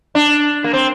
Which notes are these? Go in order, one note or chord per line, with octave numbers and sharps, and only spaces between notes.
D4
A#3
C4